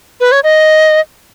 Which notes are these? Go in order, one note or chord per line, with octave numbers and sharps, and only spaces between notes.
B4
C#5
D#5